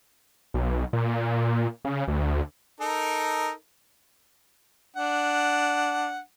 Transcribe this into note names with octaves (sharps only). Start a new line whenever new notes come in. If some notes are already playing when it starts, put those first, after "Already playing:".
B1
A#2
C#3
D2
D#4 A4 A#4
D4 F#5